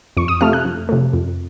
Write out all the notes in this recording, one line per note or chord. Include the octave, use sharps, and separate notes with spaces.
F2 C#6
D#6
C3 F3 A3 F6
F#6
F2
C3 F3 A3
F2